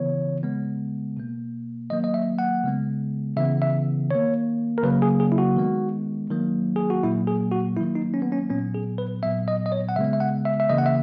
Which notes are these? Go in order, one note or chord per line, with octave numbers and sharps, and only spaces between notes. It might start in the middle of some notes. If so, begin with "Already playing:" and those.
Already playing: C#3 E3 B3 C#5
C#3 G#3 B3
B2 A#3
D#3 F#3 A#3 D#5
D#5
E5
F#5
C#3 G#3 B3
C#3 E3 B3 E5
E5
D#3 A#3 C#5
A#4
C#3 F#3 A#3 B4
G#4
G#4
E4
F#4
D#3 G#3 B3
D#3 F#3 A#3
G#4
F#4
A#2 F#3 A#3 E4
G#4
F#4
D#3 F#3 A#3 E4
D#4
C#4
B3
C#4
A#2 F#3 B3 C#4
G#4
B4
A#2 F#3 B3 E5
D#5
D#5
C#5
F#5
C#3 G#3 B3 E5
E5
F#5
E5
E5
C#3 E3 A#3 D#5
F#5
E5